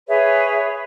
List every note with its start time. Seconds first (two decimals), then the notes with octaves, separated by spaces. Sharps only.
0.07 G#4 B4 C#5 E5